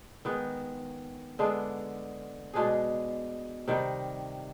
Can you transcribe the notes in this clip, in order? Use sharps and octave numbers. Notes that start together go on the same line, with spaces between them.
D#3 G#3 B3
D3 G#3 B3 D4
B2 G#3 D4 G#4
C3 D#3 G3